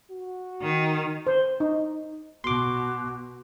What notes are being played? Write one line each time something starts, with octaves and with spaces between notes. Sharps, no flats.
F#4
D#3
C5
D#4
B2 F#4 C6 D6